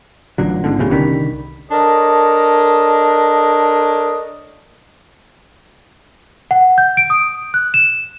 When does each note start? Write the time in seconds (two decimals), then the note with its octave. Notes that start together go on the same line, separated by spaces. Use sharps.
0.38 A1 D3 F#3 F4 F#5
0.64 G#2 D3 B3 C#4 G#5
0.79 D1 D2 C#3 C#4 G4
0.90 C2 D3 D#3 B5 B6
1.72 D4 A4 A#4 C#5 D#5
6.51 F#5
6.78 G6
6.97 D7
7.10 D#6
7.54 F#6
7.74 E7